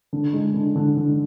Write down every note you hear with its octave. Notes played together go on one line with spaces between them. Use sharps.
D3
G#3
D3
D3
D3